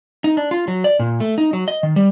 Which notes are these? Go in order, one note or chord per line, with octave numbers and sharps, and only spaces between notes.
D#4
D4
F4
F#3
D5
A#2
A3
D#4
F#3
D#5
D#3
G3